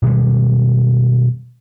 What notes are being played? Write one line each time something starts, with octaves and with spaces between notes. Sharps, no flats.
B2 D#3 G3 G#3